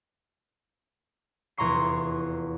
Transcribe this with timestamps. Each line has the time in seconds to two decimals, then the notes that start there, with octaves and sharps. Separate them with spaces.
1.57 F1 E2 A#5 C6 C#6 C7